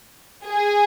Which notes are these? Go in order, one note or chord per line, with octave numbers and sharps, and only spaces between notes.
G#4